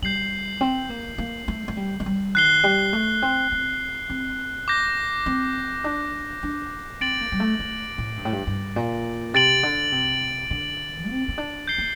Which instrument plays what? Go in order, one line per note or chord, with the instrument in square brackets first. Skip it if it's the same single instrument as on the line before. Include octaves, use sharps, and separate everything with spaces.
[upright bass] G3 [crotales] G6 C7 F#7
[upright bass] C4
A#3
A#3
A3
A3
G3
A3
G3
[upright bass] D#3 [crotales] F#6 C7 G7
[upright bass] G3
A3
C4
C4
C4
[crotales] D6 G6 A#6
[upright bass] C4
D4
D4
[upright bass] C4 [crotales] A6 D7 F#7
[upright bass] A#3
G3
A3
A3
A2
G2
A2
G2
G2
A#2
[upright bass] C3 [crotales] A6 D7 F#7
[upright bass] D3
C3
D3
C4
C4
D4
[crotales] G6 C7 G7
[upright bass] A#3